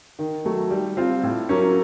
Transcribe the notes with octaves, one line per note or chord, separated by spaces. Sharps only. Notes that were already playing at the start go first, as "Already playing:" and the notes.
D#3
F#3 A3
G3
C4 F4
A2
F#3 A#3 C#4